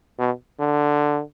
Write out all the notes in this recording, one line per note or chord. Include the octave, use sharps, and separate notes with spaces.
B2
D3